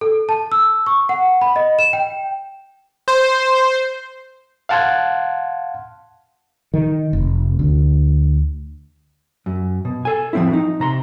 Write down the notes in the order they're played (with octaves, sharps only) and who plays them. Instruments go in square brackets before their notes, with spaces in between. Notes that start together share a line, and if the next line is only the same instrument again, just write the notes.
[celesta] A4
A5
E6
C#6
F#5
B5
D#5
E7
G5
[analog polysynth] C5
[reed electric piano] F5 F#5 A5 C6 F#6 G#6
[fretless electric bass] D#3
F1
D2
[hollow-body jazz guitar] F#2
B2
A4 G#5
F3 C4 E4
D#4
C3 A#5 C6